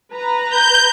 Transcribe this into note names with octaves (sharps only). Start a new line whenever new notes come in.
B4 A#5
G6